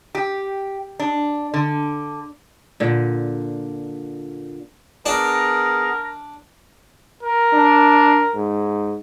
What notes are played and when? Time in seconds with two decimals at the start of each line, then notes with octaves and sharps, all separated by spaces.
0.15 G4
1.00 D4
1.54 D3
2.80 A#2 D3
5.06 B3 D4 G#4 A#4
7.23 A#4
7.53 D4
8.35 G#2